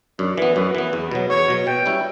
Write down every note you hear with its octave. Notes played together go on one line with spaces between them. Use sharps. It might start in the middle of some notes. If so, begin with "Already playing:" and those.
F#2 D4
E3 B3
F#2 B4
E3 B3
E2
B2 F#3
E2 C#5
B2 F#3
B2 G5
G3 C#4 E4